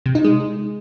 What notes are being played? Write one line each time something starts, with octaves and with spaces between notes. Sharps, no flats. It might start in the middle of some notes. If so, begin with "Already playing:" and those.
C3
D#4
G#3